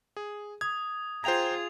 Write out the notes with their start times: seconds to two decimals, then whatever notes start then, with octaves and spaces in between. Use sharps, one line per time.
0.17 G#4
0.61 D#6 G#6
1.24 F4 G#4 C5 G5 A#5 G#6 F7